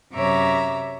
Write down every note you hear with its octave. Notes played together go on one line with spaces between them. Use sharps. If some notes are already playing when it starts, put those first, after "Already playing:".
F#2 C3 C#5 E5 A#5 D6